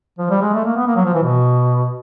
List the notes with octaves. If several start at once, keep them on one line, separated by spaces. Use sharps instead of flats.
F3
G3
G#3
A3
A#3
B3
A#3
F#3
F3
E3
B2